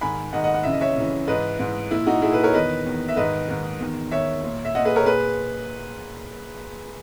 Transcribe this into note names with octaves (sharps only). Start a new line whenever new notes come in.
G#2 D#3 G#5 B5
G#2 D#3 D#5 F#5
D#5 F#5
F#5
F#2 C#3 E3 E5
D#5
C#5 E5
F#2 C#3 E3
G#2 E3 B4 D#5
G#2 E3
A#2 E4
D#4 F#4
A#2 E4 G#4
G#4 B4
A#4 C#5
E2 D#3 B4 D#5
E2 D#3
E5
G#2 D#3 B4 D#5
G#2 D#3
E2 D#3
E2 D#3 C#5 E5
A#2
E5
A#2 D#5 F#5
G#4 B4
A#4 C#5
A#2 G#4 B4